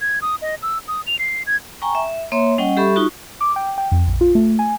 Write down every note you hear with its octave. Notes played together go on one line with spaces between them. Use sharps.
G#6
D#6
D#5
E6
D#6
F7
C7
G#6
G5 G#5 A#5 C#6
E5
A#3 C#5 E5 C6
G3 C#4 D#5 F#5 G5
G3 G4 A4 E5 B5 C#6
D#4 F4 F#4 C#6
D6
G5
G5
F2
A#1
F4
A3
G#5